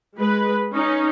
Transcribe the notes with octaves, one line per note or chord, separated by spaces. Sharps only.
G#3 B4
C#4 D#4